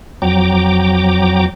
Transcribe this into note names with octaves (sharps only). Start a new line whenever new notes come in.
F2 F#3 G5 A#5 D6